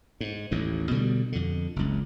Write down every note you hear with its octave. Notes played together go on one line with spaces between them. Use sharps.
G#2
A1 D#2 A2
B2 D3 F3 G3
F2 D3
F#1 C#2